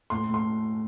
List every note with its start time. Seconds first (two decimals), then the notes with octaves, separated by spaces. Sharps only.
0.10 A2 C6
0.29 A2 C6